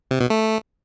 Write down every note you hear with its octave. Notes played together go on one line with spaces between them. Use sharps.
C3
B2
A3